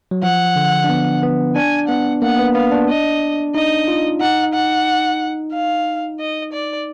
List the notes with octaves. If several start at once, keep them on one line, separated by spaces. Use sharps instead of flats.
F#3
F3 F#5
D3
D4
B3
B3
D4 G#5
B3 F#5
A#3 F#5
B3
B3 F5
D4
D#5
D#4 D#5
F4
D#4 F#5
F#5
F5
D#5
D5